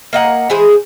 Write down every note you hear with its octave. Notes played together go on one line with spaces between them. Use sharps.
A#3 D#5 F#5
E3 G#3 G#4 C5